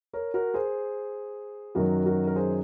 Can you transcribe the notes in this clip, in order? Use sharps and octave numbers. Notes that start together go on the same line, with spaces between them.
A#4 C#5
F#4 A#4
G#4 C5
F#2 D#3 F#3 F#4 A#4
F#4 A#4
A#4
G#4 C5